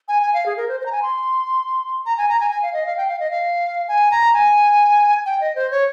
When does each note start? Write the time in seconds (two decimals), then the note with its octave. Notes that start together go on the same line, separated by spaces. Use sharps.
0.08 G#5
0.22 G#5
0.34 F5
0.46 G#4
0.57 A#4
0.68 C5
0.80 C5
0.86 A#5
0.92 G#5
1.02 C6
2.06 A#5
2.18 G#5
2.29 A#5
2.40 G#5
2.51 G#5
2.63 F5
2.74 D#5
2.86 F5
2.97 G5
3.08 F5
3.20 D#5
3.31 F5
3.88 G#5
4.11 A#5
4.34 G#5
5.26 G5
5.41 D#5
5.56 C5
5.71 C#5